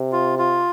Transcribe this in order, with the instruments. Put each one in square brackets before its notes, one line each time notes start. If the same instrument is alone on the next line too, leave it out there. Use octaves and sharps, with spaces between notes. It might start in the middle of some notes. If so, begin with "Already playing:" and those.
Already playing: [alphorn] C3
[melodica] F4
F4